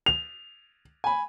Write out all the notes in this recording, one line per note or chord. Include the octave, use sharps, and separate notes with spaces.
F7
G#5 B5